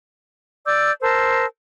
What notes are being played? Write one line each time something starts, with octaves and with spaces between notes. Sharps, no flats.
D5 D6 E6 G6
A#4 C5 A5 E6